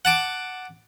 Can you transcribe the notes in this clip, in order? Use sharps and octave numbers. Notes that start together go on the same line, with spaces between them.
F#5 A5 D6